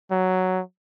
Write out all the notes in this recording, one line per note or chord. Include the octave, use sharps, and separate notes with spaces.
F#3